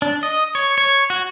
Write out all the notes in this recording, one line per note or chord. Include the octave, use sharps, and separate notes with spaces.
D4
D#5
C#5
C#5
F#4